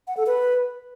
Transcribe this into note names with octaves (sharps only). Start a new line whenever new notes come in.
F#5
A4
B4